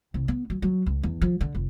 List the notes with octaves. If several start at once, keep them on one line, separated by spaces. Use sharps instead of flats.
C2
B3
F#3
F#3
C#2
E2
F3
D3
F1